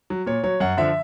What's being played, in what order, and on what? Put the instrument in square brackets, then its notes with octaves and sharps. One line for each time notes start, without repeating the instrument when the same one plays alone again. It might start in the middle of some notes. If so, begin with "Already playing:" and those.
[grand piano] F#3
A#2 C#5
F#3 C#5
F#2 F#5
D3 F3 E5